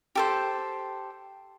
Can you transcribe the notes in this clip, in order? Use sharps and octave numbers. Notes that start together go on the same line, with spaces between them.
G4 A4 C5